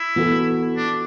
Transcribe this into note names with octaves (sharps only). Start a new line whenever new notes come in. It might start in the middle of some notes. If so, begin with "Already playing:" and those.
Already playing: E4
E3 B3 F#4 A4
D4